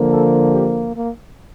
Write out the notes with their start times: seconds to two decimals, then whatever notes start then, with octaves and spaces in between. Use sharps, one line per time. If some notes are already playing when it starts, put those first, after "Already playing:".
Already playing: D3 F3 A#3
0.10 A4
0.53 G4
0.95 A#3